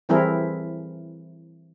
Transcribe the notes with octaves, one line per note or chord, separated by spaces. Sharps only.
E3 G3 C4 E4 G#4 A#4